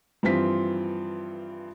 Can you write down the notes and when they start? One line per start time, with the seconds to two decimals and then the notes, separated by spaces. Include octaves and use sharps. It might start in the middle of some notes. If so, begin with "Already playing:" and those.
0.23 G2 E3 F3 C4 F4 B6